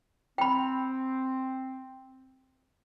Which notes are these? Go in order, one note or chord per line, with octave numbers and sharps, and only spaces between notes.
C4 G5 B5